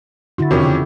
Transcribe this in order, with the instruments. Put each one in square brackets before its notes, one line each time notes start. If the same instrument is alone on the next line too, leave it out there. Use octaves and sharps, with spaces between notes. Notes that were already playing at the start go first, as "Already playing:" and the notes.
[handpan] D3 E4 F#4 [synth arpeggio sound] C6 A6
[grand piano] F2 C3 C#4 [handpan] D#3 G4 [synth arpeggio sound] F#4 A#4 C#5
[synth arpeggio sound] C#3